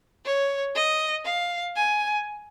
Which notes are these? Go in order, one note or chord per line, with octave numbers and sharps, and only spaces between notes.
C#5
D#5
F5
G#5